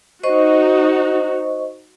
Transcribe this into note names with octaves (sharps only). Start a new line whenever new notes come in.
D#4 F#4 C5 D#5 C#6